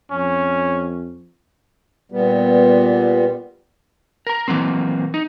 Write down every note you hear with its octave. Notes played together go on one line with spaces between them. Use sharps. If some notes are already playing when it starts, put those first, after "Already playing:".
F2 C#4
A#2 G3 B3
A#4 A#5
E3 F#3 A#3 C4
D#4